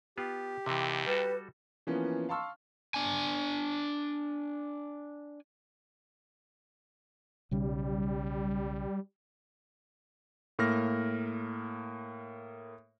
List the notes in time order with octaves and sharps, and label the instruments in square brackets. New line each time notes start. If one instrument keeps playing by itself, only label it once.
[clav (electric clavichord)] B3 F4 [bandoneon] G4
[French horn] D#2 [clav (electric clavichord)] C3 E3
[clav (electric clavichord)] G3 F#4 A4 [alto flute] B4
[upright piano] E3 F3 A#3 B3 C#4
F5 A5 C6 C#6 E6 F6
[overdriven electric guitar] D4 G#5
[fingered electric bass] B1 C#3 [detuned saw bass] G3
[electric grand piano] A2 A#3 F6 A#6